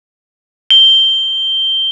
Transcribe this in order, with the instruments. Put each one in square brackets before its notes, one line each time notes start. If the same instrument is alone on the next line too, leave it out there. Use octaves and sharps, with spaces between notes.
[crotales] G7